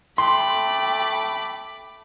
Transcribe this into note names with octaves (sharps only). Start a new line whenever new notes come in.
A3 G5 B5 C6 D6